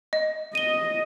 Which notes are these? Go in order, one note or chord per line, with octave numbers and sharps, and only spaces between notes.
D#5
D#5 D#7 G7